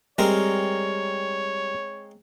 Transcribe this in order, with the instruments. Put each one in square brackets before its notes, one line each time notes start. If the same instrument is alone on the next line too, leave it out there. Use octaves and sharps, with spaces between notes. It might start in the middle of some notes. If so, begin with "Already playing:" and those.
[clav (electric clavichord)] G3 [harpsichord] G#3 C4 A#4 [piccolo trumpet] C#5